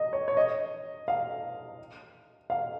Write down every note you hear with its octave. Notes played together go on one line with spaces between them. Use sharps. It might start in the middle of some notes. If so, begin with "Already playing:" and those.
Already playing: D#5
C#5
C#5
D#5
F5
F5